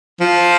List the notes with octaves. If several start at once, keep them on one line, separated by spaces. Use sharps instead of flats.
F3